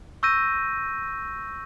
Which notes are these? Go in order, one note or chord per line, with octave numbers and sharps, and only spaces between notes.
C#6 E6 G6 A#6 D#7